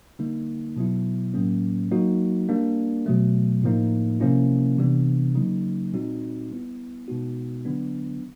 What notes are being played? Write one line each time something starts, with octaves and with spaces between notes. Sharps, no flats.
D3 G3 A#3 D#4
B2 F#3 B3 E4
A2 F#3 A#3 C#4
F#3 A#3 D#4 F#4
G3 A#3 D4
B2 F#3 A3
A2 F3 A#3 D#4
C3 F3 A#3 C#4 E4
C3 E3 G3 B3 D4
C#3 F#3 A#3 D#4
A#2 G3 C4 D#4 F#4
G3 B3 E4
B2 G#3 B3 D#4 F#4
D3 F#3 B3 D4